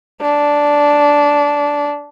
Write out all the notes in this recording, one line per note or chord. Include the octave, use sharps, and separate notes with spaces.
D4